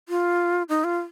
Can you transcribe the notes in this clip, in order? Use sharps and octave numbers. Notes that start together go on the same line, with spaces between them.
F4
D#4
F4